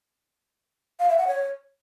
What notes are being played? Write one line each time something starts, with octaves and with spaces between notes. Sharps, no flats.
F5
E5
F#5
C#5